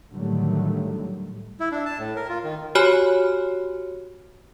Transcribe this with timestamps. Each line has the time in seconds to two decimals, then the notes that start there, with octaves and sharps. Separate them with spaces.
0.10 A2 D3 D#3 F#3 G3 A3
1.60 E4
1.72 D4
1.86 A5
1.98 A2
2.16 A#4
2.29 F4
2.44 D#3
2.75 F#4 G4 C#5 G#5 B5 F6